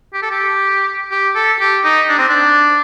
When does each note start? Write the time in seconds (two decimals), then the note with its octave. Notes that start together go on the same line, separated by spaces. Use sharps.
0.14 G4
0.22 A4
0.31 G4
1.11 G4
1.35 A4
1.60 G4
1.84 D#4
2.09 D4
2.18 C4
2.29 D4